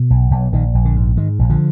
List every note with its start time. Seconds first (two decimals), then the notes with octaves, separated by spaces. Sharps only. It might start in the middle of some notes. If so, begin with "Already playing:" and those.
Already playing: B2
0.10 B1
0.31 B1
0.52 A#1 D#3
0.74 A#1
0.85 D3
0.96 G#2
1.16 G#2 D#3
1.39 A#1
1.49 D3 F3